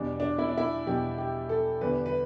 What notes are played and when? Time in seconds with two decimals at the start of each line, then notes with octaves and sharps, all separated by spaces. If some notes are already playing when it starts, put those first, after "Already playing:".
Already playing: E2 B2 G3 D4
0.20 D4
0.38 E4
0.49 D4
0.57 E4
0.86 E2 B2 G3 G4
1.18 G4
1.49 A4
1.81 E2 D3 G3 B4
2.06 B4